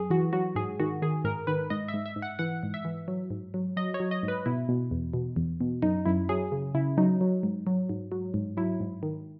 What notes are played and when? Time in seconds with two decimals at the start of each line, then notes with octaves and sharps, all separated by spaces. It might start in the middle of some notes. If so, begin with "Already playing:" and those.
Already playing: F#2 G#4
0.10 E3 F#4
0.33 F#3 F#4
0.56 G#2 G#4
0.80 D#3 F#4
1.02 D#3 G#4
1.24 G#2 A#4
1.47 D#3 B4
1.70 G#2 D#5
1.88 E5
1.94 G#2
2.06 E5
2.16 G#2
2.22 F#5
2.39 E3 F#5
2.63 G#2
2.74 E5
2.85 E3
3.08 F#3
3.30 G#2
3.54 F#3
3.77 F#3 D#5
3.94 C#5
4.00 F#3
4.11 D#5
4.23 G#2
4.28 B4
4.46 B2 E4
4.69 B2
4.91 E2
5.14 B2
5.36 E2
5.61 B2
5.82 F#2 D#4
6.06 F#2 E4
6.29 F#3 G#4
6.52 C#3
6.74 C#3 E4
6.97 F#3 D#4
7.21 F#3
7.43 G#2
7.67 F#3
7.89 G#2
8.12 F#3
8.34 G#2
8.57 F#3 E4
8.80 G#2
9.03 D#3